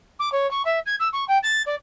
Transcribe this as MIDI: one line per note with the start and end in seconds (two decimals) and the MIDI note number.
0.19 0.29 86
0.32 0.49 73
0.51 0.62 85
0.65 0.79 76
0.86 0.95 92
0.99 1.08 88
1.13 1.24 85
1.28 1.38 79
1.42 1.62 93
1.66 1.75 74